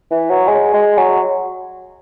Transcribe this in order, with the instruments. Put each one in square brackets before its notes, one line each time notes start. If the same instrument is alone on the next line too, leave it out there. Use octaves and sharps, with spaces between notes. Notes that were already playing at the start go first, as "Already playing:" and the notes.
[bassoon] E3
F#3
G#3
G#3
F#3